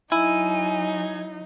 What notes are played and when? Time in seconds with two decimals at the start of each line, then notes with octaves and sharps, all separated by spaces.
0.12 F#3 D#4 E4 G#5